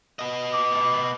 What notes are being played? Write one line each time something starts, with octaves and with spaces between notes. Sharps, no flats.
B3 D#5
D6